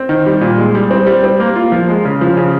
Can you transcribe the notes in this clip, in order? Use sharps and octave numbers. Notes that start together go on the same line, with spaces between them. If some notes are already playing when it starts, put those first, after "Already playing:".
Already playing: C4
D#3
G3
A#2
G#3
G3
C4
G3
C4
A#3
F4
F3
G#3
C#3
F3
C#3